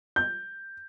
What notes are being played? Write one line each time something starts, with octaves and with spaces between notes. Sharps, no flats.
G6